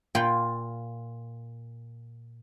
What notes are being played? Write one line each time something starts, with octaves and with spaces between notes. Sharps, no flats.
A#2 F4 G5 B5